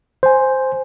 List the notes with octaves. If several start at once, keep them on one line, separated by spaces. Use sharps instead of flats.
C5 G#5